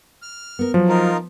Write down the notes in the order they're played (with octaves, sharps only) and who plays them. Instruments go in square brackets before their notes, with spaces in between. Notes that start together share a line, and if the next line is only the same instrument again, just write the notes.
[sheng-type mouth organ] F6
[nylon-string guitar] B3 A#4
[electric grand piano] F3 [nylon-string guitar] F#3
[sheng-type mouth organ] D#4 F4 A#4